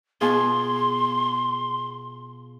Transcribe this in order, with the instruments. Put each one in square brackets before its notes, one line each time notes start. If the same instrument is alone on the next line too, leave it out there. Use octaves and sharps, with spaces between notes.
[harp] B2 F4 G#4 [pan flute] C6